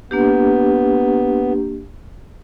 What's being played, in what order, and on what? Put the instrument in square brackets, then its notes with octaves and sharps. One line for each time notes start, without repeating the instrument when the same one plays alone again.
[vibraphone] A#3 D4 G4 [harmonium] B3